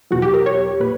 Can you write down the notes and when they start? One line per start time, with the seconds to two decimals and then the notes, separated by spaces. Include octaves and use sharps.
0.11 E2 B2 F#3 F#4
0.22 G4
0.34 A#4
0.46 C#5
0.80 A#2 B4